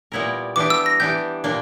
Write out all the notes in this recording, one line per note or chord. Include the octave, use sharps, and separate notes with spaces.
A#2 G3 B3 E4 A#4
E3 B3 D4 G4 D6
E6
A#6
E3 B3 D4 G4 G6
A#2 G3 A#3 D4